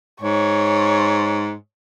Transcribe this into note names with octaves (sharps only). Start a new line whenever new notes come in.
G#2 C#5